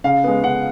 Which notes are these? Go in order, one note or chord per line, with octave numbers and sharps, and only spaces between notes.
C#3 F5
G#3 B3
C#3 F#5